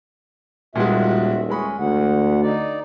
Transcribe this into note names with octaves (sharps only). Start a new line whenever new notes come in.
D#1 A#2 G3 G#3 F#4 E5
G#3 C#4 B5 C#6
D2 F#5
D#4 D5